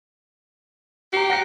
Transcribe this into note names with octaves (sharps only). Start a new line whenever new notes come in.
G4 A#5 C7
F#5 A#6 C#7